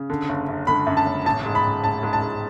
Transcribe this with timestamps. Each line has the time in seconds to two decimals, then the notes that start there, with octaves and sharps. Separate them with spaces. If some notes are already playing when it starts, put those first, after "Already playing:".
Already playing: C#3
0.10 D3
0.29 F#1
0.48 F#2
0.67 D3 B5
0.87 F#2
0.97 A5
1.06 F#1
1.25 A1 A5
1.45 G#2
1.55 B5
1.64 A1
1.84 A1 A5
2.03 G#2
2.13 A5
2.22 G#2